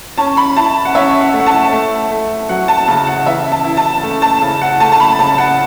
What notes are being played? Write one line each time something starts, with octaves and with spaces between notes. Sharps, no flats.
C#4 A5
B5
E4 A5
F#5
C#4 E5
F#5
A3
F#5
A5
A3
A3
F#3 F#5
A5
C#3 A5
F#5
E3 E5
A5
E4
A5
A3
A5
C#3
F#5
A3 A5
A5
B5
C#3 A5
F#5